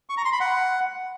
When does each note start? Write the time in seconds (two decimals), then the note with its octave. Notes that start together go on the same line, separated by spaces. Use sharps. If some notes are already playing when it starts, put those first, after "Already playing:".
0.09 C#6
0.17 A#5
0.25 C6
0.33 B5
0.40 F#5